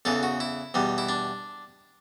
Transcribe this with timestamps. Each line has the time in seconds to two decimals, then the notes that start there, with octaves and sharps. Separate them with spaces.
0.05 E2 C#3 E3 A4
0.23 F#4
0.40 E4
0.74 E2 B2 G3
0.98 E4
1.09 D4